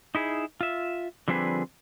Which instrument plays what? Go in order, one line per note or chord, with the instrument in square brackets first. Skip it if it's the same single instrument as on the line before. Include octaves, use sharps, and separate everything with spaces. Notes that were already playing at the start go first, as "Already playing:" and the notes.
[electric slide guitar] D#4 E4 G#4
F4 E5
D3 F3 G3 C4 G#4 B4